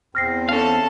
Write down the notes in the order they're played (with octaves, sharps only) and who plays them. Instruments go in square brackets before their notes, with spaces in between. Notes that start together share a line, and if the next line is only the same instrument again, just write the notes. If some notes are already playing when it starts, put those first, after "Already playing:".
[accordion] E2 C4 [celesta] F6 A#6 C7
[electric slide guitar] C#4 F5 [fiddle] A4 A5